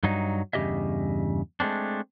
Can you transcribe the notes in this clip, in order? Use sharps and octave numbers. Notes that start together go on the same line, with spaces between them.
G2 F#3 D#4
E2 G2 C#3 G4 D#5 E5
G#3 A3 C4 D4